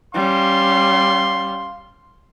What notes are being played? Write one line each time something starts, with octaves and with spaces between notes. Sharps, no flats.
G3 C#4 F5 C6